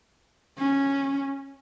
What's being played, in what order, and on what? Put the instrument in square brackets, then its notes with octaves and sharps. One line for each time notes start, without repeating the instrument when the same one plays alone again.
[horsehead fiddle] C#4